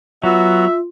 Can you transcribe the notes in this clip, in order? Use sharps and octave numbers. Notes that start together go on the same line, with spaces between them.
F#3 B3 F4 F#4 E5